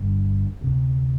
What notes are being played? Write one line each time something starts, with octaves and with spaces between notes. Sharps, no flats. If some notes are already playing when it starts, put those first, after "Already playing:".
Already playing: G1 G2 D3
D2 C3